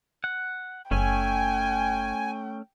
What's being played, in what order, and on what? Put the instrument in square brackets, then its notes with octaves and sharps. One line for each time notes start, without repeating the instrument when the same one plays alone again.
[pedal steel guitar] F#5
[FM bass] F#1 [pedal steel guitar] A3 C#4 [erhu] G5 [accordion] G#5